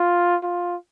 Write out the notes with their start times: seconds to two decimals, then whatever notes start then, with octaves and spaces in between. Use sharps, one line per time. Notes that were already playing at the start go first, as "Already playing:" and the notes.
Already playing: F4
0.43 F4